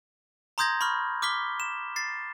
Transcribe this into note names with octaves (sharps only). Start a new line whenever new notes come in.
A#5 C6 D#6 G6 G#6 A#6
B5 C#6 F6
D6 F6 B6 G7
E7
A6 C7